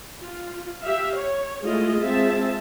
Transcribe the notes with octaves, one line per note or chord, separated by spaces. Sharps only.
F4
G4 E5 F5
C#5
G#3 A3 E4 F4 G#4 D#5
G#3 C4 F4 G#4 E5 A5